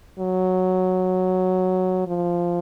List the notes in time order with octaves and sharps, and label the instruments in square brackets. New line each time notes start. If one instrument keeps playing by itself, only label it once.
[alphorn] F#3
F3